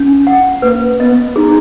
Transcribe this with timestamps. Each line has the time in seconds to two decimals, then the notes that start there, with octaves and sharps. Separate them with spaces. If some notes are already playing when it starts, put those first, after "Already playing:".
Already playing: C#4
0.27 F#5
0.62 A#3 B4
1.00 B3 D#5
1.36 D#4 G#4